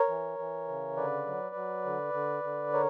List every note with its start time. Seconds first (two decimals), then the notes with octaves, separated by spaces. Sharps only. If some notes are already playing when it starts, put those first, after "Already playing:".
Already playing: A#4 C#5
0.09 E3
0.39 E3
0.68 C#3
0.97 D3 B4 D5
1.26 F#3
1.55 F#3
1.86 D3
2.14 D3
2.44 D3
2.73 A#4 C#5